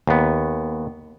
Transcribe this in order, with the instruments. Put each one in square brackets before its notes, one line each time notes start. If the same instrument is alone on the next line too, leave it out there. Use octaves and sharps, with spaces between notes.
[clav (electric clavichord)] D#2 B3